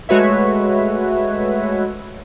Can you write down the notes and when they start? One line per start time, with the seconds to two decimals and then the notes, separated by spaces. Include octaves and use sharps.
0.09 G#3 A3 F#4 B4 C#5 E5